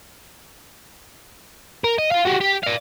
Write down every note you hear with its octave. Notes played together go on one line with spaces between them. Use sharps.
A#4
D#5
F4 F5
F#4 G4
G4
D5 F5